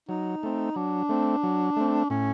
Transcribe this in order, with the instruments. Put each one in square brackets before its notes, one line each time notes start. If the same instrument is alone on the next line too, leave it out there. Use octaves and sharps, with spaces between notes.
[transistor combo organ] F#3 [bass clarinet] D#4
[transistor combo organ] A3 C4
[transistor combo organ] F#3 [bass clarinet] D4
[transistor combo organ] A3 C4
F#3
A3 C4
[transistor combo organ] A2 [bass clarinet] C#4